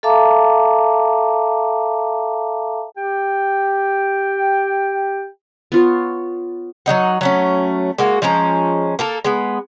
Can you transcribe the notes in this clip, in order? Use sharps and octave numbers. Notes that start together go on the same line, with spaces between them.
A4 E5 F5 A5 A#5 D6
G4 G5
B3 F4 C#5
F#3 G#3 D#4 F#5
F#3 A3 C#4
G#3 A#3 F#4
F3 G#3 C#4 A#5
A#3 A4 A#4
G#3 B3